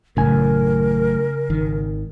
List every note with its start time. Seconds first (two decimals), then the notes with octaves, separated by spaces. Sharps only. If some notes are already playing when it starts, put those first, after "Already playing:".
0.17 A1 F#2 A2 C#3 A#4 G#5
1.50 G#1 D#3